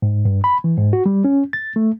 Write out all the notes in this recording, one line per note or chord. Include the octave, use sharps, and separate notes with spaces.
G#2
G2
B5
E3
G#2
F#4
G3
C#4
A6
A3